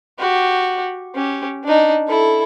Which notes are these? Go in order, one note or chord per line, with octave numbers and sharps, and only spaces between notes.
F#4 G4
C#4 G4
D4 D#4
E4 A4